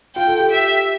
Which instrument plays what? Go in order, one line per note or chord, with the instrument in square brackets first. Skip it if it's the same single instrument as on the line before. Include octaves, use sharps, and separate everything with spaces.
[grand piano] F4 [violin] G5
[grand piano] A4
G4
[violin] E5